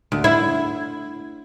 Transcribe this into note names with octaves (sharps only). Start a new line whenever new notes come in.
D2
E4